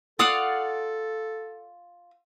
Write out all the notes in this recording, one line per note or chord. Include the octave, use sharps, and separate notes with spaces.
F4 A4 D5 F5 F#5 D#6